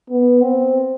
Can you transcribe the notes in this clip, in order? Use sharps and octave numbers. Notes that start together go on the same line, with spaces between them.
B3
C4